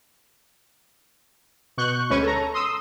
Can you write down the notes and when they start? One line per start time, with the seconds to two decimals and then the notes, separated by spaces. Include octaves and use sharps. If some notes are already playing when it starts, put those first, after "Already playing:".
1.77 B2 C#6 F#6 G6
2.10 D2 G#3 C#4 B4 C#6 D#7
2.23 A4 A#5
2.54 C6 D#6 E6